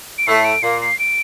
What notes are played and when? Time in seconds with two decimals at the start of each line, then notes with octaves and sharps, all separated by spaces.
0.18 D7
0.27 A2 A3 C7
0.44 D7
0.62 A#2 A#3 C7
0.81 C7
0.99 D7